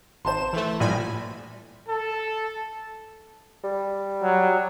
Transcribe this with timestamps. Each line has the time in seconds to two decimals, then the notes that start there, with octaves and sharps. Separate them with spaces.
0.25 G#1 C5 A5 C6 E7
0.53 E3 A3
0.80 A#1 A2 G3 G#5 B5
1.88 A4
3.64 G3
4.23 F#3